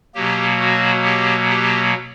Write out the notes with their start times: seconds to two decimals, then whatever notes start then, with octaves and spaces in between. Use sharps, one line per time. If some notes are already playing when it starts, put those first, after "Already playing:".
0.15 B2 F#3 A#3 G4
0.60 F#4
1.04 G4
1.49 G4